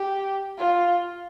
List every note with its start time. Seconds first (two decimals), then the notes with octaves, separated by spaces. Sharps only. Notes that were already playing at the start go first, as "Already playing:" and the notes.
Already playing: G4
0.58 F4